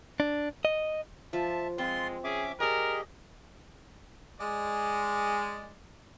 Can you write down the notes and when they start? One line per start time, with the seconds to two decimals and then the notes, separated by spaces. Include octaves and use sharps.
0.20 D4
0.65 D#5
1.33 F3 E5 A5
1.78 G#3 C4 F4 C6
2.24 C#4 G#4 E5 D6
2.60 G4 G#4 A#4 D5 D#5 G#5
4.40 G#3 D5